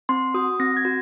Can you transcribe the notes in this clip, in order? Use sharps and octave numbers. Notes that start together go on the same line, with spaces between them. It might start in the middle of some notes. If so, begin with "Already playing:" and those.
C4 C6
F#4 D#6
C4 A#6
G#6
F#4